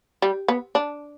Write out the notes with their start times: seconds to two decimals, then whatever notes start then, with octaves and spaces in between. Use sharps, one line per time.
0.22 G3
0.48 B3
0.75 D4